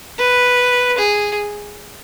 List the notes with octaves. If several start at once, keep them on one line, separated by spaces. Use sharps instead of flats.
B4
G#4